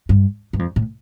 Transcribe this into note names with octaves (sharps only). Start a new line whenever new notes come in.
G2
G2
F2
A2